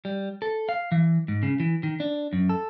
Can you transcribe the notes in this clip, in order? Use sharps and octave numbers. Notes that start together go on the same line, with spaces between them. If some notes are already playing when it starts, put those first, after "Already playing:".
G3
A4
F5
E3
G#2
C#3
E3
D#3
D4
F#2
A4